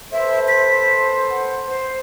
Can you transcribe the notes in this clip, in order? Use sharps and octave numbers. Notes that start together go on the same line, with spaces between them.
A4 B4 C5 E5
B6
F#5
C5